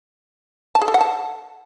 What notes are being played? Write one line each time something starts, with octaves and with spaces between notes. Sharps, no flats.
A5
G#4
A4
F#5
A5